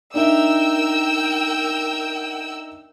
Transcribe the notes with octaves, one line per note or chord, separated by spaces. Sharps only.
D4 D#4 A#4 E5 G5 E6